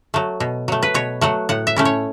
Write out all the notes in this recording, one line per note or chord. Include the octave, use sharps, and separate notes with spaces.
F#3 A3
B2
F#3 A3
B4
B2 C#5
F#3 A3 F#5
A2 F#5
E5
A3 C#4 E4
C#5